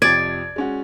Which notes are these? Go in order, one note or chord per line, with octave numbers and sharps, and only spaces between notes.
F2 C3 F3 D5 G#6
G#3 C#4 F#4